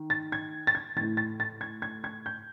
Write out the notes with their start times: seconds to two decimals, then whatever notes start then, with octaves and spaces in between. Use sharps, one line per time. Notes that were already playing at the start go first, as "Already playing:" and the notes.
Already playing: D#3
0.10 A6
0.32 G#6
0.67 A6
0.75 G#6
0.96 E3 A6
1.01 A2
1.17 A6
1.40 A6
1.61 G#6
1.82 G#6
2.04 G#6
2.26 G6